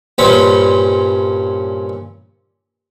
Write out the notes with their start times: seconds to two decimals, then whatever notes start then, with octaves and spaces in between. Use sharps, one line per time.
0.18 G2 A#2 C4 C#4 B5